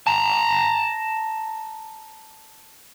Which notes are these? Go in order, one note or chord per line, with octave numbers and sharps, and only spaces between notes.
A5 A#5